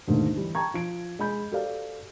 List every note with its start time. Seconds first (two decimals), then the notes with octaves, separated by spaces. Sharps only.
0.08 D#2 G#2 D3 A3 A#3
0.36 E3 G3
0.55 G5 A5 A#5 C#6 G#6
0.74 F3 D7
1.19 G#3 G#5 B5 G6
1.52 F#4 G4 A4 C5 D5 F5